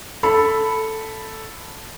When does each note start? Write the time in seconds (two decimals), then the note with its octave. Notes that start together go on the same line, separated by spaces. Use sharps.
0.23 A4 B5